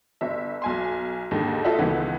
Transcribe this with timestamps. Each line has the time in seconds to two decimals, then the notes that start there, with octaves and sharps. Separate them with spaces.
0.21 G1 E5
0.62 B1 G#5 C6
1.31 D#2 G#2 D3
1.64 F4 A4 D#5 E5 F#5
1.79 C#2 D#3 E3 B3